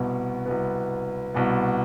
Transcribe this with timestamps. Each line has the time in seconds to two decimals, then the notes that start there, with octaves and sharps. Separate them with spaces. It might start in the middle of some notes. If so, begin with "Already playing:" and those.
Already playing: C2 B2 B3
0.46 C2 B2 B3
1.34 C2 B2 B3